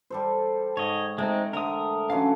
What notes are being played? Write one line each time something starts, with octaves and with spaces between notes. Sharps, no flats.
G3 A4 C5
G#2 C#5 D#5
G#3 A3 C4 D#4 G5
D3 G#3 A3 A#4 D#6
D3 E3 F#3 C#4 F5